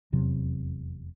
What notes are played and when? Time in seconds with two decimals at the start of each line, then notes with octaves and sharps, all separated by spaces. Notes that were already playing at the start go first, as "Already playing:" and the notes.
0.12 F1 E2 C3 F#3